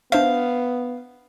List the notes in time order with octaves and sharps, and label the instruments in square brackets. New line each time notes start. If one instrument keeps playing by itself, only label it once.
[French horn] B3 [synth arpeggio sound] D4 C5 E5 [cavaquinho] F5